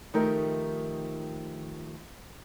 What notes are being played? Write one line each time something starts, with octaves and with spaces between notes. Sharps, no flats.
D#3 F3 A3 D#4 G4 A#4